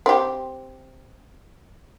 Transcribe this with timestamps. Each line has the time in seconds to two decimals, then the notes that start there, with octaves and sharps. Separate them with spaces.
0.06 C4 G4